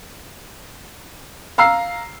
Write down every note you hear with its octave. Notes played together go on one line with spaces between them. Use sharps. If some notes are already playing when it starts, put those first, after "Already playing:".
F5 A#5 E6 C7